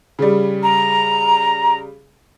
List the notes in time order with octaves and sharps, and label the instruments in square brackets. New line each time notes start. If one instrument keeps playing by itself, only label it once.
[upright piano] C#3 G3
[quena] A#5